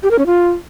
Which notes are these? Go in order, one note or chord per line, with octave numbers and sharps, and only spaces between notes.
G4
A#4
C#4
F4